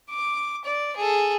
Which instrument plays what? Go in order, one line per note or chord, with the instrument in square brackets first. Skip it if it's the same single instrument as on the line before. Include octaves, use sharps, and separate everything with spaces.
[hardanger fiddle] D6
D5
G#4 A4